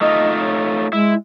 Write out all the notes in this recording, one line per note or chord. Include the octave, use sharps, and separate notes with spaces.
A3 D#4 F4 D#5
C#5
G#3 E4